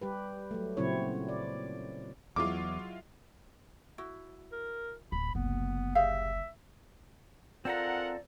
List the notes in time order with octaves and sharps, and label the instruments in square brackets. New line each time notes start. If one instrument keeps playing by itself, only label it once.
[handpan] G3 G4 B4
F#3 A3
A#2 C#3 F#3 C4 E4 C#5
D5
[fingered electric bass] E2 [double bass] F#3 [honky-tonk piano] G#3 E4 F4 [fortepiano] D6
[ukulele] E4 F#4
[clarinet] A#4
[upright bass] D1 [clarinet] B5
[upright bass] F#1 C2 [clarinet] B3
[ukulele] G4 G#4 F5 [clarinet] E5
[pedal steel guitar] C4 A4 A#5 [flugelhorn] F4 [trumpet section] A#4 F#5 [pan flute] D5